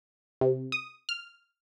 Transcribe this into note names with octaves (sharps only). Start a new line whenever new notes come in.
C3
D#6
F6